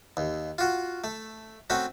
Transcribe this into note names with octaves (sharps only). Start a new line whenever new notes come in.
D#2
F4 F#4
A3
A3 C4 C#4 F#4